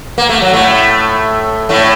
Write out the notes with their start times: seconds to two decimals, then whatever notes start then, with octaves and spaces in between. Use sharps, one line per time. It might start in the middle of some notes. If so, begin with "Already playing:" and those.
0.18 A#3
0.29 A3
0.42 F#3
0.53 A2 A3
1.69 A2 A3